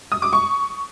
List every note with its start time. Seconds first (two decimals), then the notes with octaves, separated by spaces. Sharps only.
0.12 D#6
0.22 D6
0.33 C#6